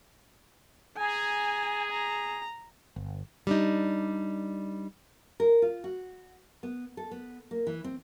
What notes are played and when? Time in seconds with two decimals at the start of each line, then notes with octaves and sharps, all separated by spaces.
0.97 G#4 G#5 A#5
1.91 A#5
2.96 G1
3.47 G3 D4 D#4
5.40 A#4
5.62 F4
5.84 F#4
6.63 B3
6.97 A4
7.11 B3
7.51 A#3
7.67 E3
7.84 C4